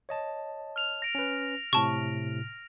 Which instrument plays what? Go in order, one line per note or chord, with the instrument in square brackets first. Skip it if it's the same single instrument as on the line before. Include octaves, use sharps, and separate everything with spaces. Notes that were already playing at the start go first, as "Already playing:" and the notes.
[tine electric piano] C#5 D#5 A5
[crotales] F6 F7
A#6 D7
[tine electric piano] C#4 B4
[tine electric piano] A2 C3 [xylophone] A5 C#6